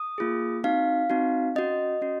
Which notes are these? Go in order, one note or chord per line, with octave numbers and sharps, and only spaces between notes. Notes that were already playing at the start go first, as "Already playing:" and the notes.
Already playing: D#6
A#3 F4 G#4
C4 D#4 F#4 F5
C4 D#4 F#4
C#4 F#4 D#5
C#4 F#4